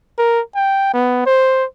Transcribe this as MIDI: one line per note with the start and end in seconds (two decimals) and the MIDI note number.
0.18 0.40 70
0.55 0.94 79
0.94 1.22 59
1.26 1.65 72